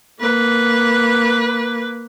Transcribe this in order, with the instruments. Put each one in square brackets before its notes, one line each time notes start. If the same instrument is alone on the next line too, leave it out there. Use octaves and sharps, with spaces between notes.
[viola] A#3 B4